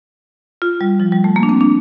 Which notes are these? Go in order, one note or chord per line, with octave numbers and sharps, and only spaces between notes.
F4
G3
F3
G3
A3
A#3
D4
C4
D4